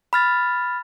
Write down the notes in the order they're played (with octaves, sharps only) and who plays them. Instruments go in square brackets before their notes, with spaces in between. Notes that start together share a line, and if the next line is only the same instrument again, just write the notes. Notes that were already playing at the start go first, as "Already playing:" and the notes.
[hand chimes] B5 F6 A6